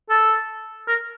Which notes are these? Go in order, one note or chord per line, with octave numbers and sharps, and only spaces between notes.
A4
A#4